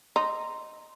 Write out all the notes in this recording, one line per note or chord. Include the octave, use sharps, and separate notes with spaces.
D#4 C6